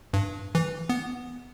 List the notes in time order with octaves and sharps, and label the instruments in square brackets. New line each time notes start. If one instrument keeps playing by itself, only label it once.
[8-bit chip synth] G2
E3
B3